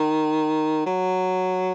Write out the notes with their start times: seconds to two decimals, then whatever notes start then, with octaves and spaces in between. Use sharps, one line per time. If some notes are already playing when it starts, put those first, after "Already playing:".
Already playing: D#3
0.86 F#3